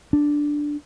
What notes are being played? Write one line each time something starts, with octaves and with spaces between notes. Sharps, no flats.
D4